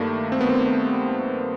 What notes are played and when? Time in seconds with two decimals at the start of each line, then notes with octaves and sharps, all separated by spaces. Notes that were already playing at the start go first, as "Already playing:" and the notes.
Already playing: G2 D#3 G3 A3 A#3
0.32 C4
0.41 B3
0.49 C4